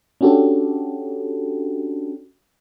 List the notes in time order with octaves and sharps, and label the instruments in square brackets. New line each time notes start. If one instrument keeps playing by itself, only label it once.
[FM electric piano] C#4 D4 F#4 G4 A4